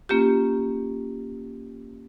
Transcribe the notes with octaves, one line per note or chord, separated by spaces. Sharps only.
A#3 C#4 F4 G4